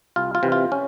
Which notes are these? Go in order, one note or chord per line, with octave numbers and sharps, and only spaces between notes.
C2 F4
F4
C3 E3
F4
C#4